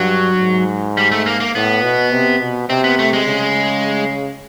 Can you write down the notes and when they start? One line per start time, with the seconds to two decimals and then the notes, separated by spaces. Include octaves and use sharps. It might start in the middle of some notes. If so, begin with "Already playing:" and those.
Already playing: G2 F#3
0.40 G#2
0.97 G3
1.11 A3
1.26 A#3
1.40 A#3
1.55 A2 B3
1.84 B2
2.13 C3
2.41 B2
2.69 C3 C4
2.84 B3
2.99 A3
3.13 G#3
3.27 C#3